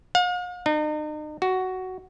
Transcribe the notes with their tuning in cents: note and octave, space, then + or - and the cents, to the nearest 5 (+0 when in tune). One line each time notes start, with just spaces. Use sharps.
F5 +45
D#4 -40
F#4 +10